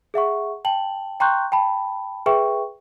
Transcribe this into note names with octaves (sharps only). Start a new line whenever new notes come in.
G#4 E5 F#5 C#6
G5 A5 F#7
G5 A#5 C6 C#6 F#6 G6
G5 A5 B5
G#4 B4 E5 G5 C#6